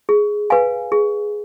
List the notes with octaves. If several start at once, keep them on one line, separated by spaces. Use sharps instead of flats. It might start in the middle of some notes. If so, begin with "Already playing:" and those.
G#4
B4 F5 G#5
G#4